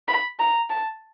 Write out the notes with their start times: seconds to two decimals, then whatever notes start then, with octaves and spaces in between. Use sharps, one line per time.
0.08 B5
0.39 A#5
0.70 A5